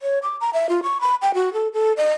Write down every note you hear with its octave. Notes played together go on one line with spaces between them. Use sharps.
C#5
D6
A#5
E5
F4
C#6
B5
G5
F#4
A4
A4
D#5